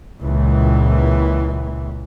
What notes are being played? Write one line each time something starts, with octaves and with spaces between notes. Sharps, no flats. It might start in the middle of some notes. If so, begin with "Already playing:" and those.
C#2 A#2 E3